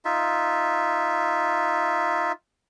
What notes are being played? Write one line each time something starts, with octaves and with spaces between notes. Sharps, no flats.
D#4 F4 E5